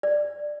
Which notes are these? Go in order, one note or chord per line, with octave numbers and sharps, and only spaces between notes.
D5